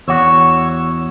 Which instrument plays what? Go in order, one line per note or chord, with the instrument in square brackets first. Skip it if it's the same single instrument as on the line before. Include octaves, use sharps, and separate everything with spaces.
[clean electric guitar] E2 F#4 [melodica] C#5 E6